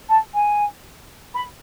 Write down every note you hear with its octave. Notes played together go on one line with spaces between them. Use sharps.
A5
G#5
B5